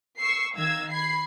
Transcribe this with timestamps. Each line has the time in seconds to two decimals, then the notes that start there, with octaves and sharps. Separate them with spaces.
0.18 C#6 E6 C7
0.56 D#3 F5 E6 G#6
0.91 B5 G#6 C7